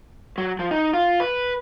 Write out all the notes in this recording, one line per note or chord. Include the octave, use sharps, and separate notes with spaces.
F#3
F3
D#4
F4
B4